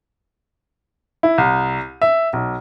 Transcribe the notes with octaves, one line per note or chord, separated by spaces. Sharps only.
E4
C2
E5
B1